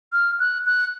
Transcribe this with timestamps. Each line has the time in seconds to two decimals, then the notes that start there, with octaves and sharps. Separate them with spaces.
0.13 F6
0.40 F#6
0.66 F#6